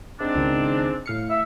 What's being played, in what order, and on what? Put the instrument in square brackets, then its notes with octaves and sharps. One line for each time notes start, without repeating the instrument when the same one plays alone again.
[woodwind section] G#2 C4 D4
[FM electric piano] C#2 D#3
A2 F5 C#7
[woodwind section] E5